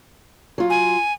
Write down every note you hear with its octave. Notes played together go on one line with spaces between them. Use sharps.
F#3 F4
G#5